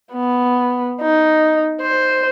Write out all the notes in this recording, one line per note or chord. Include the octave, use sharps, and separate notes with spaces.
B3
D#4
C5